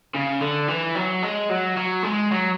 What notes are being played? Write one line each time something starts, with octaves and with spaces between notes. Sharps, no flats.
C#3
D3
E3
F#3
G#3
F#3
F#3
G#3
F#3